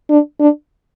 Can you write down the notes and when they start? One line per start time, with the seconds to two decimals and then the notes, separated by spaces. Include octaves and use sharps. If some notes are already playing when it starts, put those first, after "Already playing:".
0.10 D4
0.40 D4